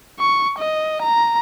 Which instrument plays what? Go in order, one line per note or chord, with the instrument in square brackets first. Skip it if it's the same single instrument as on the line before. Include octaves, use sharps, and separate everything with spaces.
[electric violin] C#6
D#5
A#5